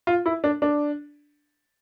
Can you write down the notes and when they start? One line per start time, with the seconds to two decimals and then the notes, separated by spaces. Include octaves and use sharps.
0.07 F4
0.26 E4
0.44 D4
0.62 D4